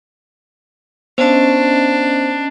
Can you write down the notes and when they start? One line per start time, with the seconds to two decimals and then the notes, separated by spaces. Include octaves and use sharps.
1.18 B3 C#4 D4 C5 D#5